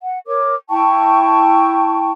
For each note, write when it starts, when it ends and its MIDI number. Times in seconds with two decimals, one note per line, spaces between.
0.01 0.18 78
0.26 0.55 70
0.26 0.55 73
0.26 0.55 86
0.70 2.11 64
0.70 2.11 79
0.70 2.11 81
0.70 2.11 85